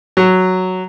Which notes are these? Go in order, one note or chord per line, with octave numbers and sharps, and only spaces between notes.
F#3